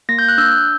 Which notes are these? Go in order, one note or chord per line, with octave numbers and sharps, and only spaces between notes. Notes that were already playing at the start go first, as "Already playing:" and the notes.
A#3 A#6
G6
F#6
D4 E6 G6